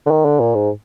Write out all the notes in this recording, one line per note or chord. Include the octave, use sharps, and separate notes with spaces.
D3
D#3
D3
A#2
G#2